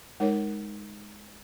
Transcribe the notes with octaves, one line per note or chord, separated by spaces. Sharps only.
G#3 D#4 A#4 C#5